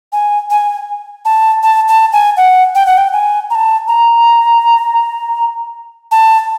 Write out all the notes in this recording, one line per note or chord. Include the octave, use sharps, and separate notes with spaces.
G#5
G#5
A5
A5
A5
G#5
F#5
G5
F#5
G5
G#5
A#5
A5
A#5
A5